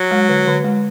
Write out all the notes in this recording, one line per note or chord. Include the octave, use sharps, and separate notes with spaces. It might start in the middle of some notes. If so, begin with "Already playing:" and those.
Already playing: F#3
G#3
D3
D3
G#3